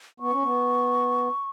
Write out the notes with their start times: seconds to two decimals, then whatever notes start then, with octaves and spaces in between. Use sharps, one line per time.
0.20 B3 C#6
0.32 C#4
0.43 B3